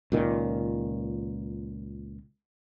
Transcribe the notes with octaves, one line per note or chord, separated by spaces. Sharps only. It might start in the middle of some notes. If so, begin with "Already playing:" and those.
C#2 A#2 D#3